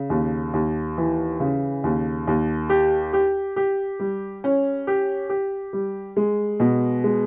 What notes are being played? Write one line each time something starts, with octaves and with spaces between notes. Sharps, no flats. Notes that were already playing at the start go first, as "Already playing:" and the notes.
Already playing: C#3
D#2
D#2
E3
C#3
D#2
D#2
G4
G4
G4
G3
C#4
G4
G4
G3
G#3
B2
G#3